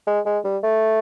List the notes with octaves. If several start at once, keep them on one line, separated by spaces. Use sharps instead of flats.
G#3
G#3
G3
A3